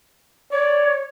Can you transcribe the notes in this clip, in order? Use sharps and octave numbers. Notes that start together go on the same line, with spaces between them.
C#5 D5